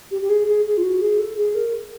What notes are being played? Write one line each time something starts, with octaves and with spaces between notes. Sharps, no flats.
G4
G4
G#4
G#4
G#4
F4
F#4
G#4
A4
G#4
A#4